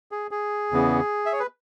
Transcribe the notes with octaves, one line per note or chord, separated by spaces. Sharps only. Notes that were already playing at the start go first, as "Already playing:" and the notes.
G#4
G#4
E2 C#3 E3 B3
E5
C#5
B4